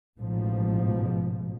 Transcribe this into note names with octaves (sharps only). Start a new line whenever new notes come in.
A1 G#2 B2 F3